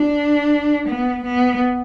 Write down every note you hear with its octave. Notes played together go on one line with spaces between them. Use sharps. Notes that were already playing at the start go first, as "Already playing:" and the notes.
Already playing: D4
B3
B3